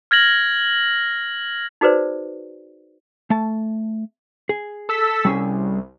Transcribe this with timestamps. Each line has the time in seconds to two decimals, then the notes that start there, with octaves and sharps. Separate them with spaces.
0.11 F6 G#6 A#6 F#7
1.81 D#4 F#4 G#4 B4 C5 D5
3.30 A3 A5
4.49 G#4
4.89 A4 E6 B6
5.25 C2 G3 C#4 G#4